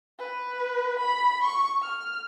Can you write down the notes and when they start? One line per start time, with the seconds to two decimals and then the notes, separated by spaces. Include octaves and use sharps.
0.19 B4
0.99 B5
1.43 C#6
1.82 F6